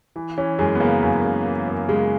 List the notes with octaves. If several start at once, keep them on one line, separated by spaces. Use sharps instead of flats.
E3
E3 C#4
F#2 G#3
B3
C#3 A#3
F#2
C#3
E3
F#2
C#3 G#3